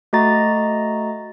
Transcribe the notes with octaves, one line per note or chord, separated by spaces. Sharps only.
A3 F#4 D#5 A#5 A6